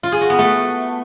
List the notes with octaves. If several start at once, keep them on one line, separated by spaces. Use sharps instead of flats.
F4
G#4
F#4
B3
A3